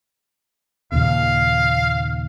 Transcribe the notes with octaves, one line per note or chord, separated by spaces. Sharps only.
D#2 A#2 C#3 F5